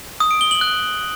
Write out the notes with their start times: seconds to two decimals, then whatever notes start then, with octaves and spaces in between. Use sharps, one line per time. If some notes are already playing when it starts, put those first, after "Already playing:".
0.20 D#6
0.31 D7
0.41 G7
0.51 F#7
0.61 F#6